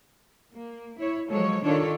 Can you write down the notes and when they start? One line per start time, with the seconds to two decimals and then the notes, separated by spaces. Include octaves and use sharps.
0.52 A#3
0.98 E4 C#5
1.29 F3 F#3 G#3 A4 C#5
1.64 D#3 D4 F4 A4 C#5